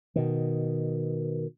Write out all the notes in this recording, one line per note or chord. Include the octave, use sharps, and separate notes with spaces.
B2 D#3